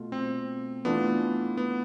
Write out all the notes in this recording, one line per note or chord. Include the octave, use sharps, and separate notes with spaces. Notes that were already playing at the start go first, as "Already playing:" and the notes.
Already playing: B2 A3 F4
C4
E3 A3 B3 D4 F4
B3